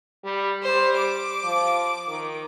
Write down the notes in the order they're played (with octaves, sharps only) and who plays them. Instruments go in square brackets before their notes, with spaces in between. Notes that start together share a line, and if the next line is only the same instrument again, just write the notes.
[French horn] G3
[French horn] G3 [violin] C5
[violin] D6
[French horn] F3
D#3